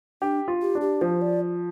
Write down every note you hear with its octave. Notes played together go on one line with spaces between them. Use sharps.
D4 G4
F4
G4
D4
G4
F3 C5
D5